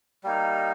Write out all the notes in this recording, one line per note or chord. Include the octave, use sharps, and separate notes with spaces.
G3 A#3 D#4